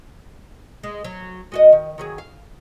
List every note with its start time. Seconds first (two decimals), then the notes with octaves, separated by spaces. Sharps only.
0.83 G#3
1.04 F#3
1.52 G#3 F#4 D#5
1.72 D#3
1.98 D#3 F#3 G#4
2.18 F5